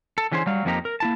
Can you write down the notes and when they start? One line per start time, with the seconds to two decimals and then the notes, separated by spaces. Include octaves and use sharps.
0.18 A4
0.32 D3 E3 C#4 G#4 A4 C5
0.46 F#3 G3 F5
0.65 F2 F3 A#3 D#4 G4 A#5
0.85 A#4
1.00 A#3 E4 A5